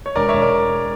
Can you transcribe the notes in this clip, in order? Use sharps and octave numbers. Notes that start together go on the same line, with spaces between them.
C#5
E1 A#4 D5
C#5 E5
E1
A#4 D5